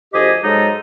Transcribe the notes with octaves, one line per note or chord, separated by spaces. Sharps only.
D2 F3 G4 G#4 D#5
G#2 F#3 G#3 D#4 A4